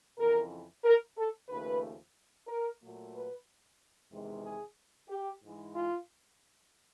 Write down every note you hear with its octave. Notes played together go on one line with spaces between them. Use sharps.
F2 C#3 E3 A#4
A#4
A4
D#2 C#3 F3 A3 B4
A#4
A#2 F#3 A3
B4
E2 C3 D#3 G#3
G#4
G4
G#2 E3 G#3
F4